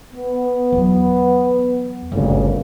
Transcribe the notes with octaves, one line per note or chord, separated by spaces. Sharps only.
B3
E2 F#3
G1 D2 A#2 C#3